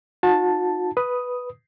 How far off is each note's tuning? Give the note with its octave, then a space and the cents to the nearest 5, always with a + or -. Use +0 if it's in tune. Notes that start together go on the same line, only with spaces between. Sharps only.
D#4 +0 F#4 -40 A5 +0
B4 +0 D#6 +0